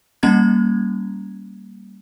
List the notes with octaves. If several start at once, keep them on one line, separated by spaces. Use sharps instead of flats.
G3 A#3 C#4 A#5 F#6 G#6